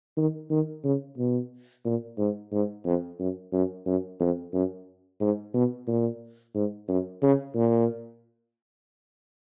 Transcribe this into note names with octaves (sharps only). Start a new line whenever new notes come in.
D#3
D#3
C#3
B2
A#2
G#2
G#2
F2
F#2
F#2
F#2
F2
F#2
G#2
B2
A#2
G#2
F#2
C#3
A#2